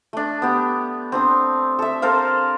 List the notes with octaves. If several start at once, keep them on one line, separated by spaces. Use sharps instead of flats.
A3 D4
B3 G4
C4 D4 D#6
A4 E5
A4 A#4 C5 F5